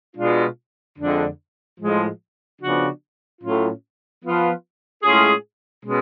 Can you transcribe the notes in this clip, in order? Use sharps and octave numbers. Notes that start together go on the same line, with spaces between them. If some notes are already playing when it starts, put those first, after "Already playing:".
B2 G#3 D4 F4
F2 D3 F3 G#3 D4
A2 F3 G#3
C#3 F3 B3 D4 F#4
A2 F#3 A3 C#4 F4
F3 B3 F4 B4
A2 G#3 C#4 F4 G#4
B2 G#3 C#4